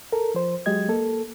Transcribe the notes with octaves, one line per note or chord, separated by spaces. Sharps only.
A4 A#4
F3 C5
F#3 G#3 G4 D#5 G#6
A#3 A4